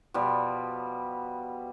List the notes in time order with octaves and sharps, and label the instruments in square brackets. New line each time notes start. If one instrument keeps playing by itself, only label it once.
[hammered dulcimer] B2 F3 G3